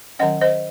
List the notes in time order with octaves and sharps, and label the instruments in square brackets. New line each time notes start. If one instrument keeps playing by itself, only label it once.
[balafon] D#3 F#3 C#4 D#5 F#5
C5 D#5